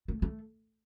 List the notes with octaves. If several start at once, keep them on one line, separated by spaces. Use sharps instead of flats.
A3
A3